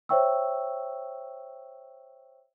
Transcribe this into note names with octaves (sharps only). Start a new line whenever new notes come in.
C5 C#5 E5 G5 C#6 E6